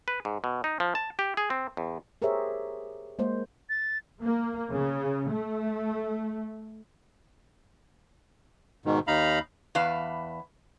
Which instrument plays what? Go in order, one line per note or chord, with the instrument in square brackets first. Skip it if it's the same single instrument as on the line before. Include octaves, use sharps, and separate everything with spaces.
[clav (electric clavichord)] B4
G#2
B2
D#4
F3
A5
G4
G#4
C4
E2
[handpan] G4 G#4 A#4 C5 C#5 E5
G#3 A#3 C5
[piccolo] A6
[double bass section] A#3
C#3
A3
[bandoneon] G#2 B2 D#3
D#2 D#4 F5 A#5 B5
[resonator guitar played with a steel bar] E2 B4 F5 A5